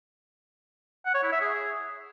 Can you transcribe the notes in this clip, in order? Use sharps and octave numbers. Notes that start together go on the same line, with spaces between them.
F#5
C#5
E4
E5
G#4